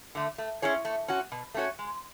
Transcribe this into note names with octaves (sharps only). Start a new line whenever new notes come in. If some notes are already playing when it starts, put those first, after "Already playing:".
D3 A3
A3
C#4 E4 G#4 C#5
A3
C#4 F#4
B2
A3 C#4 F#4 C#5
G#3